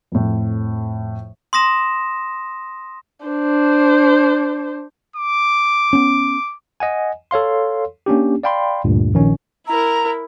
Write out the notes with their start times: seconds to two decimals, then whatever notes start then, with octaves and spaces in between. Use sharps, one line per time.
0.12 F2 A2
1.53 C6 D#6 A#6 E7
3.26 D4 C5
5.16 D6
5.93 B3 C#4
6.80 D#5 F#5 G#5
7.31 A4 C#5 F5 C6
8.06 A#3 C#4 D4 G4
8.43 D5 F5 G5 B5 C6
8.84 D2 G2 A#2
9.14 A#1 D#3 C#4
9.68 E4 A#4 A#5